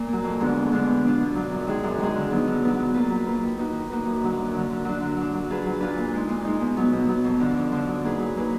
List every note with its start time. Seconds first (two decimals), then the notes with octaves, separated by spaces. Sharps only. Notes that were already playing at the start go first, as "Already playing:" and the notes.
Already playing: A#2
0.08 F#3 A#3
0.24 F2
0.40 D3 G#3 B3 D4
0.56 F2
0.72 D3 G#3 B3 D4
0.88 B2
1.04 F#3 D4 F4
1.21 B2
1.35 F#3 D4 F4
1.51 F#2
1.67 D#3 G#3 D#4 G#4
1.84 F#2
1.99 D#3 G#3 D#4 G#4
2.15 D3
2.31 F#3 B3 D#4
2.47 D3
2.63 F#3 B3 D#4
2.78 F#3
2.94 A#3 F4 B4
3.10 F#3
3.27 A#3 F4 B4
3.43 D#3
3.57 A#3 D#4 F#4 B4
3.74 D#3
3.90 A#3 D#4 F#4 B4
4.06 F#2
4.21 D3 F#3
4.38 F#2
4.54 D3 F#3
4.70 D3
4.85 F#3 D4
5.01 D3
5.17 F#3 D4
5.34 F#3
5.50 D4 F4 G#4 B4
5.66 F#3
5.80 D4 F4 G#4 B4
5.98 A#2
6.13 G#3 D#4
6.29 A#2
6.45 G#3 D#4
6.61 B2
6.77 F#3 B3
6.92 B2
7.09 F#3 B3
7.24 F2
7.40 D3 F3
7.57 F2
7.72 D3 F3
7.88 F#3
8.04 A#3 D#4 G#4 B4
8.19 F#3
8.36 A#3 D#4 G#4 B4